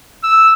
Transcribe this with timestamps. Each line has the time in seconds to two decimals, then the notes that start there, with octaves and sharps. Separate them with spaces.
0.24 E6